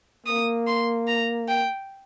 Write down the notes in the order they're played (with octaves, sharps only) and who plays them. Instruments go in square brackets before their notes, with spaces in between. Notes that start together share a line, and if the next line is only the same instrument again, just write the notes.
[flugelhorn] A#3 [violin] D#6
[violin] C6
A#5
G5